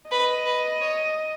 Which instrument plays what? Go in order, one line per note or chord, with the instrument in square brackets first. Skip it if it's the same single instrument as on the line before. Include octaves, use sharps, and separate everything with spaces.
[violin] B4 [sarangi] D#5
[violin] B4
C#5